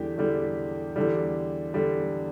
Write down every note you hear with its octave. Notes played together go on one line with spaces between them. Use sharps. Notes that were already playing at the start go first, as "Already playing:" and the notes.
Already playing: E2 D3 G3 G4
E2 D3 G3
E2 D3 G3
D3 G3